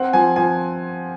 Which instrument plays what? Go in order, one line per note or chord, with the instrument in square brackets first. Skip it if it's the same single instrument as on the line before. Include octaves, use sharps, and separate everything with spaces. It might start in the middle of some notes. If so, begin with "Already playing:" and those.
Already playing: [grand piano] C4 F#5
F3 G#5
F3 G#5